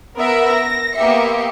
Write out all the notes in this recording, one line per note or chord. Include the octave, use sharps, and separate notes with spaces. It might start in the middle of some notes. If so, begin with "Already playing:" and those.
B3 A#4 E5 F#5
A#6
A#3 B3 G4 E5 C6 C#7